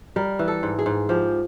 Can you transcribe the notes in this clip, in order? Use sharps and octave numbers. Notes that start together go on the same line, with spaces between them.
G3 A#4
E3
A4
G#2
G#4
G#2
F3 G4